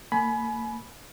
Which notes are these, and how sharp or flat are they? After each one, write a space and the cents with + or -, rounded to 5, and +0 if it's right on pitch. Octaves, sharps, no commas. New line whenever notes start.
A#3 -35 G#5 +30 B5 +0